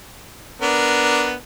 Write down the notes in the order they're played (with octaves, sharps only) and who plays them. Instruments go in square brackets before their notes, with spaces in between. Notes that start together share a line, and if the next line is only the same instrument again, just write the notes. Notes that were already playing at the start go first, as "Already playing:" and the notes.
[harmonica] B3 D4 A#4